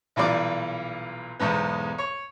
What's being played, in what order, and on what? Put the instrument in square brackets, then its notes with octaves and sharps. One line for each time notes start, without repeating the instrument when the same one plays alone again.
[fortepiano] B1 A#2 E3 G3 D5 D6
B1 E2 G#2 B3
C#5